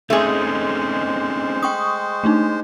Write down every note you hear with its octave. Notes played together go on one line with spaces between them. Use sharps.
G#3 A3 C4 C#4 D#4 G#4 C5
G5 C#6 D#6
A3 D4 D#4